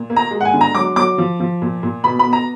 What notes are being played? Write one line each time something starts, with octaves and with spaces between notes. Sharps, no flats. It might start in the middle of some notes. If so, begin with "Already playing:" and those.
Already playing: A#2
A#3
A#5
G#3
F#5
G#5
D3
A#5
F#3 D6
F#3 D6
F3
F3
A#2
A#2
B2 B5
B5
B3
A#5